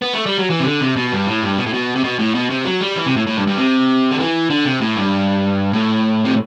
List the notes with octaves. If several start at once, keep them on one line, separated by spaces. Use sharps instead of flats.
B3
A3
G3
F#3
E3
C3
D3
C3
B2
G2
A2
G2
B2
A2
B2
C3
B2
A2
B2
C3
F#3
G3
E3
C3
A2
A2
G2
G2
C3
D3
E3
D3
C3
A2
G2
A2
C3